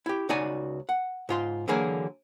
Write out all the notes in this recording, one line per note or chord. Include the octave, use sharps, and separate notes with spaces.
E4 G4
C#2 D#4 F#4 D5 G#5
F#5
G#2 F4 C6
D3 E3 F#3 A#3 G#4 A#4